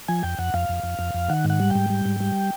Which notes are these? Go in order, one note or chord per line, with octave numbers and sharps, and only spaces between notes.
F3 G#5
F2 G5
F2 F#5
F2 F5
F2
F2
F2
F2
D#3 F#5
G#2
F#5
G3
G5
G#2
G3
G#2
G3